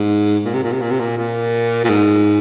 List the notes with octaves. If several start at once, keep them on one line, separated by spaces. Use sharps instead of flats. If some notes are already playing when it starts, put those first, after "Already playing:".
Already playing: G#2
A#2
C3
A#2
C3
A#2
C3
A#2
A#2
A#2
G#2